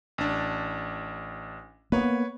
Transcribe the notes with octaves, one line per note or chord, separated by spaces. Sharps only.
A1 D4
A#3 B3 B4 C#5